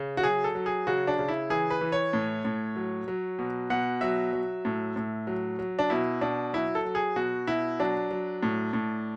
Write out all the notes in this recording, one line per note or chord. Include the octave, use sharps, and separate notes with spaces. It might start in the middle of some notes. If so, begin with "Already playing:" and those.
Already playing: C#3
F#4
F#3 G#4
A4
F#3
G#4
C#3 F#4
D4
C#3
E4
E3 G#4
B4
E3
C#5
A2
A2
F#3
F#3
B2
B2 F#5
F#3 E5
F#3
A2
A2
F#3
F#3
D4
B2 E4
B2 D4
F#3 E4
A4
F#3
G#4
B2 F#4
B2 E4
F#3 D4
F#3
A2
A2